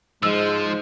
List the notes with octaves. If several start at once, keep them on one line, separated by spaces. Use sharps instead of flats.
G#2 F3 G#3 E6